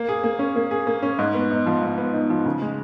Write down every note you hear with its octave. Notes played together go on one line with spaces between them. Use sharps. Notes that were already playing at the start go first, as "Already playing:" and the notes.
Already playing: A#3
G#4
A#3
C#4
A#3
G#4
A#3
C#4
G#2
B3
D#4
F3
G#2
B3
D#4
F3
C#3
G#3